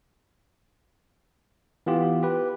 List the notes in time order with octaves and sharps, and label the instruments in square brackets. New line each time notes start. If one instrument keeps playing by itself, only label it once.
[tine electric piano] E3 B3 F4 G4
G4 B4